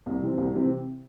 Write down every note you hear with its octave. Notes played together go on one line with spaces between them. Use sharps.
C2
C3 E3 C4
C2
C3 E3 C4